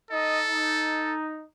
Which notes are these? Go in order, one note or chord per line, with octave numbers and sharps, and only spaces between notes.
D#4 A4 D#5
D#4